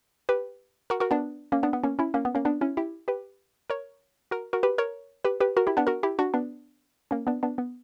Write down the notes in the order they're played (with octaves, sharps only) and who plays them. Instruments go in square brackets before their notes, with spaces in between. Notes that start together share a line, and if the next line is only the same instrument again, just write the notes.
[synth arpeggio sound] G4 B4
F#4 A#4
F#4 A#4
B3 D4
A#3 C#4
B3 D4
B3
A#3 C#4
C#4 E4
A#3 C#4
B3
A#3 C#4
B3 D4
C#4 E4
E4 G4
G4 B4
A#4 C#5
F#4 A#4
F#4 A#4
G4 B4
A#4 C#5
G4 B4
G4 B4
F#4 A#4
E4 G4
B3 D4
F#4 A#4
E4 G4
D4 F#4
B3 D4
A#3 C#4
B3 D4
B3 D4
B3